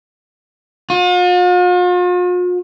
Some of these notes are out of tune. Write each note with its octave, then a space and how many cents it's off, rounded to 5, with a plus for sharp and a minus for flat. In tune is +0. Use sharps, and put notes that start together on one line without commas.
F4 +45